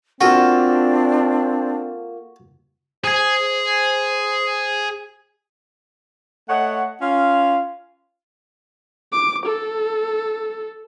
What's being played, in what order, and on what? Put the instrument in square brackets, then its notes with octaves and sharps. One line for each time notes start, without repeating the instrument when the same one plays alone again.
[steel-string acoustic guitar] A#3 F4 A4 [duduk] C4 [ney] D4 [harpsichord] F#4
[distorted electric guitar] G#4 G#5 [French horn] C5
[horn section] A3 C#5 D#5 F#5
C#4 F4 F5
[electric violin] D6
A4